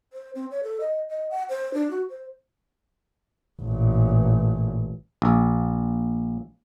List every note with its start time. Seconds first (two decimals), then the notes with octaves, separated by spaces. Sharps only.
0.13 C5
0.35 C4
0.51 C#5
0.63 A4
0.80 D#5
1.10 D#5
1.30 F#5
1.49 C5
1.74 D4
1.91 F#4
2.10 C5
3.62 A1 A#2
5.22 A#1